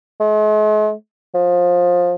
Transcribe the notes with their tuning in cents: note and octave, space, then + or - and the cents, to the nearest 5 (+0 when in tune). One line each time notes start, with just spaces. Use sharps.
G#3 +45
F3 +20